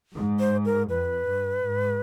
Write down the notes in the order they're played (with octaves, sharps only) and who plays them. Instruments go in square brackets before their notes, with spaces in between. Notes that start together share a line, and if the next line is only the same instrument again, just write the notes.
[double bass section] G#2
[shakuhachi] C5
A#4
[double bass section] F2 [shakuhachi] B4
[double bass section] G2
G#2